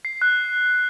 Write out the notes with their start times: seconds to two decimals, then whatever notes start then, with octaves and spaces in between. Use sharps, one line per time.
0.05 C7
0.22 F#6